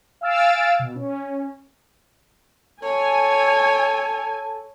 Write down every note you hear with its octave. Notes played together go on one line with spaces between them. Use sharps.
F5 G#5 E6 F6 A6 D7
B2
C#4
A4 C#5 G#5